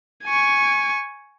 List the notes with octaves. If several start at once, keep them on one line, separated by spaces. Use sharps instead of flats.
G#5 C#6